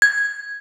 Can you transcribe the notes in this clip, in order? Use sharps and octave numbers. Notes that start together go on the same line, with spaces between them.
G#6